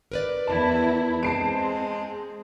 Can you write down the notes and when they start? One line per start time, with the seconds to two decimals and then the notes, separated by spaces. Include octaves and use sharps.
0.12 A#4 B4 D5
0.47 E2 E4 A5
1.23 G#3 C4 A5 C7 D7